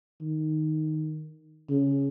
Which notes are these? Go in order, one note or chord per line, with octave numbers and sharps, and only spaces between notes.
D#3
C#3